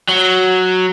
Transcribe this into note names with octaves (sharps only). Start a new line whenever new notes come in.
F#3